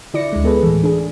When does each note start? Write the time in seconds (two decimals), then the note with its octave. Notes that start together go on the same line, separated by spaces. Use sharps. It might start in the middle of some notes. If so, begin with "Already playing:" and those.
0.14 D3 E4 D5 A#6 C#7
0.33 D2 D3 G#3
0.44 B3 G#4 A4 B4
0.63 A2 E3
0.83 D4 G#4